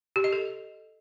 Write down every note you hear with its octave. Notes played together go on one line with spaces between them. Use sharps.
G4
D#5
A4